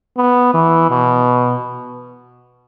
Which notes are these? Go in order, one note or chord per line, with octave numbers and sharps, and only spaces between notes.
B3
E3
B2